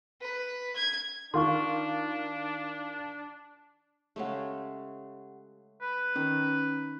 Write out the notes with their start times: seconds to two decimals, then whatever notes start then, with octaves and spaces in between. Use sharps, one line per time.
0.21 B4
0.76 G#6
1.34 D#3 D4 F4 C6 C#6
4.16 C#3 G#3 A3 G4 F#5
5.82 B4
6.16 D#3 C#4